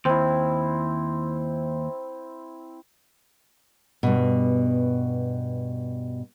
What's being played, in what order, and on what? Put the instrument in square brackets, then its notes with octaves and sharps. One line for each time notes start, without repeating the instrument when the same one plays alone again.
[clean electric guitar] D#2 [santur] C4 E4
[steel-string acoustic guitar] G2 B2